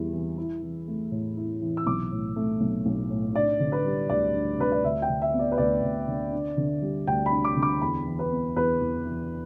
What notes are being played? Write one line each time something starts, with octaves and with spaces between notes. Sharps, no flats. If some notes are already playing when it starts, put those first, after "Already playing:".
Already playing: E2 E3 G3 E4
E3
E4
E3
A3
A2
E4
E3
E6
B1 D6
A2
A3
B1
B1
A2
D4 D5
D3
B4
G3
D2 D5
D4
D3 B4
D5
D2 E5
G5
D3
E5
B3
D5
B4
D2 D5
D2
D3
D4
D3
G3
D2 G5
B5
D4
D6
D3
D6
E2 B5
E3
B4
B3
E2 B4
E2
E3